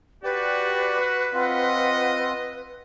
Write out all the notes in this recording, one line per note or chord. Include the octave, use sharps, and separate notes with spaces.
F#4 G4 B4 D5
C4 F4 D#5 F#5